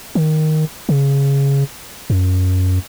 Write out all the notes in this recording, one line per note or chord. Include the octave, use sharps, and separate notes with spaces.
D#3
C#3
F#2